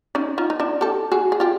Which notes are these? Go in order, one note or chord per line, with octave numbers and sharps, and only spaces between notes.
C#4 D#4
D#4 F4
D#4
D4 E4
G4 A4
F#4 G#4
G#4
F4 G4